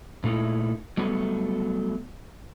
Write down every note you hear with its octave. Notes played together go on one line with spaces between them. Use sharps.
A#2 A3 D#4 E4
F#3 G3 A3 B3 F#4